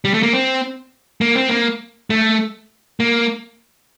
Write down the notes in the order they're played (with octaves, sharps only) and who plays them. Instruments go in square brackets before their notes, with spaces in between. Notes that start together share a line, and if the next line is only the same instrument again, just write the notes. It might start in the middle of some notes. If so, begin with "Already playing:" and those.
[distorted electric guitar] G3
A3
A#3
C4
A#3
C4
A#3
A3
A#3